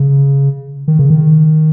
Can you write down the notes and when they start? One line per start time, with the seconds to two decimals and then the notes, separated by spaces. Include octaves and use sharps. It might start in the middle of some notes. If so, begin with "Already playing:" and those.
Already playing: C#3
0.88 D#3
0.99 C#3
1.10 D#3